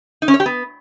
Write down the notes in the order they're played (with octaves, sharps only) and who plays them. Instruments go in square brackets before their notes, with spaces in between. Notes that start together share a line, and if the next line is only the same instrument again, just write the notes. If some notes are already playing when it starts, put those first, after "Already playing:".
[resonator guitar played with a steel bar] D#4
C#4
C#5
G4
B3